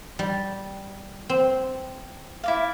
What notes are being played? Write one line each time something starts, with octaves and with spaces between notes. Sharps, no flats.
G3
C4
E4 D5 F5